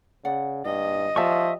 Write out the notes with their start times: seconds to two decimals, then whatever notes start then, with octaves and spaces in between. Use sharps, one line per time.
0.25 C#3 D5 F#5
0.66 G2 D#5
1.16 F3 G4 D5 E5 A5 C#6